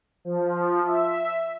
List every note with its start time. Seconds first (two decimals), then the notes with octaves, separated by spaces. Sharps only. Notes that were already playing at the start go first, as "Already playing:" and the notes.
0.25 F3
0.86 E5